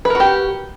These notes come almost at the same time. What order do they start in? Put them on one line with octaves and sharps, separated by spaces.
B4 A#4 F#4 G4